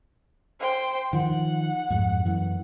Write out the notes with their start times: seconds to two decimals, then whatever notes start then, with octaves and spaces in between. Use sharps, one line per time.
0.60 C5 G5
1.13 D#3 F3 F#5
1.90 F2 G#2
2.25 F#2 E3